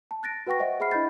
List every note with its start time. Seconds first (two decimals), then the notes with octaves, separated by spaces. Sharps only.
0.11 A5
0.23 F#6 A6 A#6 D7
0.47 F#4 B4 F#5 G5 C#6 A#6
0.59 C5 D#5 E5 F#5
0.80 G#4 E5 F#5 B5 F6 C7
0.91 D4 E4 D#5 B5 G6 A6